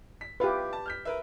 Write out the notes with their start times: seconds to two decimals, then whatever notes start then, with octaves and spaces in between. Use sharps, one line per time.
0.21 B6
0.40 E4 F4 G4 B4
0.73 A5
0.86 F6 G6 B6
1.05 A#4 B4 E5